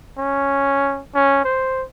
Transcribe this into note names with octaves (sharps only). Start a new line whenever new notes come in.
C#4
C#4
C5